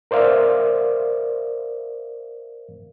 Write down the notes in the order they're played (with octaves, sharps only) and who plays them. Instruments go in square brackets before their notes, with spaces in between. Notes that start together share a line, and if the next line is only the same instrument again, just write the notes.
[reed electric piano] A#4 C5 D5 E5 F5